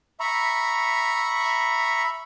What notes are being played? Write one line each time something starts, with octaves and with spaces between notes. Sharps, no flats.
E5 A#5 B5 C#6